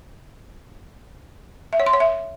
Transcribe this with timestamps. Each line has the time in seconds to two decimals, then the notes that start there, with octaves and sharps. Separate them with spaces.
1.73 E5
1.80 C#5
1.86 C6
1.93 C#5
2.00 E5